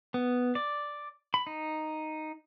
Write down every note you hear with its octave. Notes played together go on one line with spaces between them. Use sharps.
B3
D5
B5
D#4